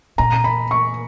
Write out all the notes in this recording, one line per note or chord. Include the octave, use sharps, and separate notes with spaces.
A#2 A#5
B5
C#6